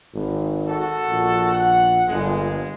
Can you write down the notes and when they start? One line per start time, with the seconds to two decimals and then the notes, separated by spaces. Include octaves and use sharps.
0.14 G#1
0.68 F#4 A4
1.10 A#1
1.53 F#5
2.08 G1 A#2 F3 G#3